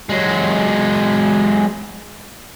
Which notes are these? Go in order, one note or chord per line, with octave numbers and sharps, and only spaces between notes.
F#3 G#3